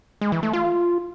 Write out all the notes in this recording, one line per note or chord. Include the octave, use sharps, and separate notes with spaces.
G#3
E3
A3
F4